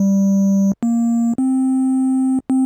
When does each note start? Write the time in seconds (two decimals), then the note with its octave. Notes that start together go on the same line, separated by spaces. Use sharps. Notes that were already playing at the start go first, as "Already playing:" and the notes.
Already playing: G3
0.83 A#3
1.38 C4
2.50 C4